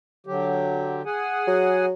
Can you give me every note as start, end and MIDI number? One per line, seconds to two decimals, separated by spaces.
0.27 1.02 50
0.27 1.02 54
0.27 1.02 67
1.05 1.86 68
1.05 1.86 78
1.05 1.86 80
1.47 1.93 54